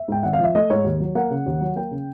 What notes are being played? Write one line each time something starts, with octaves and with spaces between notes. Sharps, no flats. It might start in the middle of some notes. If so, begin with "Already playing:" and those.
Already playing: E5
G#2 G5
G#1 F#5
F5
F3
E5
A3 D#5
G#2 C#5
D#2
F#3
A#3 F#5
C#3
D#2
F#3
A#3 G5
C#3